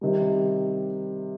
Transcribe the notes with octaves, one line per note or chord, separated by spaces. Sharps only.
C3 D#3 G3